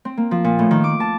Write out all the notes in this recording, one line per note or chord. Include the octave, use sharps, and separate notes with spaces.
C4
A#3
F3
A#2
A2
D#3
D6
A5